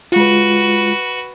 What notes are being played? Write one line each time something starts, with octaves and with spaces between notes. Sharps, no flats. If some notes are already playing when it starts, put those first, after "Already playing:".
G#3 F4 F#4 B4